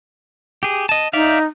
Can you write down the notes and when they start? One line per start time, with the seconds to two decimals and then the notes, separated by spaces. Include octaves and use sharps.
0.63 G4 G#4
0.89 D#5 A5
1.13 D#4 D5 E5 F5